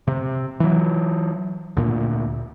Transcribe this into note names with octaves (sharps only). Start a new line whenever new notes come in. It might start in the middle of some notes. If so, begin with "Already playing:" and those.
C3
E3 F#3
D2 A#2